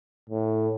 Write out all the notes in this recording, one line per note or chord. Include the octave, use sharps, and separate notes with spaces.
A2